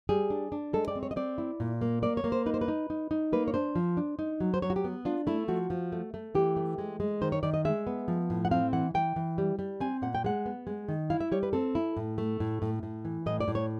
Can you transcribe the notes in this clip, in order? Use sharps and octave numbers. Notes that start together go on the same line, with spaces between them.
G3 G#4
D4
D4
G#3 A4
D5
C4
C#5
D#5
C4 D5
E4
A#2
A#3
A#3 D5
C#5
A#3
C5
D#4 B4
C5
B4
D#4
D#4
D#4
A#3 B4
C#5
D4 C5
F3
D4
D#4
F#3
C5
F#3 C#5
F#4
G4
B3
D4 F4
A3 E4
F3 F#4
F3
A3
A3
E3 G4
A3
G#3
G#3
D#3 C5
C#5
D#3 D5
D#5
G#3 E5
B3
F3
A2
F#5
C4 F5
E3 F#5
E3 G5
E3
G3
G3
C4 G#5
A#2 F#5
G5
G#3 F#5
B3
G#3
D#3
E4 F5
E5
G3 C#5
B4
C4 A4
E4
A2
A3
A2
A2
A2
E3
A2 D#5
D5
A2
C#5